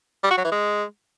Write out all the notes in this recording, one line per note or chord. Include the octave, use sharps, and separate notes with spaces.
G3
F#4
F#3
E3
G#3